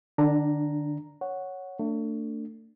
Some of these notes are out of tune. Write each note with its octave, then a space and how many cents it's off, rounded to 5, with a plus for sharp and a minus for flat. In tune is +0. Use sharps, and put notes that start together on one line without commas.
D3 +40 D4 +0 A#5 +0
C#5 +0 F#5 +0
A3 +35 D4 +0